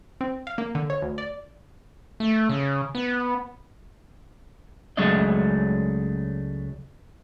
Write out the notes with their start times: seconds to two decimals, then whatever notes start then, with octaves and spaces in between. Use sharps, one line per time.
0.21 C4
0.47 F5
0.58 A#3
0.75 D3
0.90 C#5
1.02 D2
1.18 D5
2.20 A3
2.49 C#3
2.95 B3
4.97 C#2 F#3 G#3 A3 D4 D#5